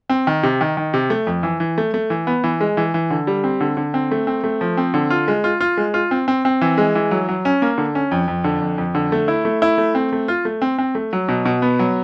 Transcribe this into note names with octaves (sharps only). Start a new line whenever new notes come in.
C4
D#3
C3
D#3
D#3
C3
A3
F2
E3
E3
A3
A3
E3
B3
E3
G#3
E3
E3
D3
G3
C4
D3
D3
C4
A3
C4
A3
F3
C4
D3
F4
G#3
F4
F4
G#3
F4
C4
C4
C4
E3
G#3
E3
F#3
F#3
C#4
A#3
D3
C#4
F2
F2
D3
F2
F2
D3
A3
E4
A3
E4
A3
C4
A3
F4
A3
C4
C4
A3
F#3
B2
B2
B3
F#3